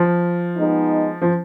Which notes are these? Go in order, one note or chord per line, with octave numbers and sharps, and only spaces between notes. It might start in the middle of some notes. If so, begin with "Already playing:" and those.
Already playing: F3
G#3 B3 D#4
F3